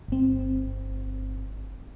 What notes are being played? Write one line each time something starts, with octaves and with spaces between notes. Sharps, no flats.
G1 C4